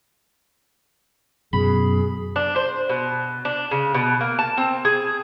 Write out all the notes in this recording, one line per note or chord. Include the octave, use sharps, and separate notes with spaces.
F#2 B2 G#4 B5
D4
C5
B2
D4
C#3
B2
A#3
A5
C4
G#4